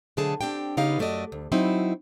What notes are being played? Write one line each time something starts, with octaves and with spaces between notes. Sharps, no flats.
B2 D3 F#3 A3 G#4 A5
C4 D4 G4 G5
C#3 B3 D#4 G4 F5
F#2 A3 F#4 D5 D#5
D2
F#3 C4 D#4 E4